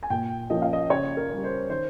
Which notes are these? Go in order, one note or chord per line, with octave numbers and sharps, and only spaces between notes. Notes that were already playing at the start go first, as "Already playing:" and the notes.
G#5
A#2 G5
F3 A#3 C#4 D#5
F5
D#5
C#3 C#5
A#4
G3 C#4
C5
D#3 C5